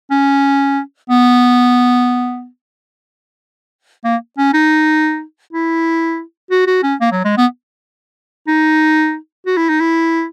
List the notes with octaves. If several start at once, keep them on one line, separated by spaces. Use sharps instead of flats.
C#4
B3
A#3
C#4
D#4
E4
F#4
F#4
C#4
A#3
F#3
G#3
B3
D#4
F#4
E4
D#4
E4